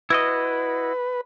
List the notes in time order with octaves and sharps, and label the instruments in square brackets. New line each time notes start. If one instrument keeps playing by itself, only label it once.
[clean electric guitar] E4 F#4 D#5 [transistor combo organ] B4